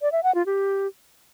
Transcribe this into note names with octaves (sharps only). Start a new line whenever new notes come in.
D5
E5
F#5
F4
G4